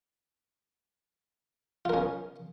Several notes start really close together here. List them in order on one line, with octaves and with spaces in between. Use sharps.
F4 A#4 C#4